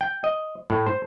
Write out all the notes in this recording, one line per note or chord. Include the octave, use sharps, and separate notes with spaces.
G5
D#5
A2
C5